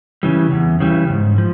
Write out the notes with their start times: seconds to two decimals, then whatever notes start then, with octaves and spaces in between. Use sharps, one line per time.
0.23 C#3 E3 G3
0.52 E2
0.80 C#3 E3 G3
1.10 G#2
1.38 F3